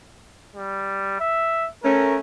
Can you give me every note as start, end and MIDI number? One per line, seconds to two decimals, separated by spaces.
0.55 1.16 55
1.20 1.68 76
1.83 2.17 57
1.83 2.17 61
1.83 2.15 70